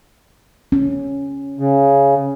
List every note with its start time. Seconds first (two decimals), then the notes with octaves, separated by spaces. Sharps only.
0.72 C#4
1.59 C#3